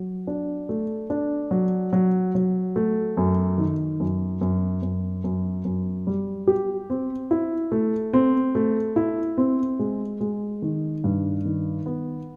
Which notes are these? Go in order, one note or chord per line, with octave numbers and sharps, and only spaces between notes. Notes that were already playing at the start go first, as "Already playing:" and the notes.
Already playing: F#3
D4
A3
D4
F#3
F#3
F#3
A3
F#2
D#3
F#2
F#2
F#2
F#2
F#2
G3
G4
C4
E4
A3
C4
A3
E4
C4
G#3
G#3
D#3
G2
D#3
B3